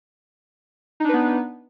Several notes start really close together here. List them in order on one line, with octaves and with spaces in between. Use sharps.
D#4 D4 B4 B3